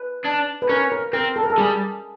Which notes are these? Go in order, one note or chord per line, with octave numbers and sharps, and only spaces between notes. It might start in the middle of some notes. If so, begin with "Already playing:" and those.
Already playing: B4
D4
B4
C#4 A#4
A#4
C4 A#4
A4
A#4
A4
G3 G#4